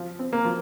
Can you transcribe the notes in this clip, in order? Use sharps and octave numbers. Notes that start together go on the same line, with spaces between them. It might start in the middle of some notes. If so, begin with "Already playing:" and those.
Already playing: F3
C4
A#3
F3